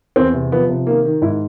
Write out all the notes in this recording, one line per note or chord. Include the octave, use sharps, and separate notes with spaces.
E2 C4
C3
F3 B3
C3
D#3 A#3
D#3
G#2 E4